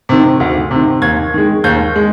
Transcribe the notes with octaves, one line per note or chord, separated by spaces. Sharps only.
C3 D#3
D2
C3
D#3
D#2 G#6
D#3 G#3
D#2 G6
G#3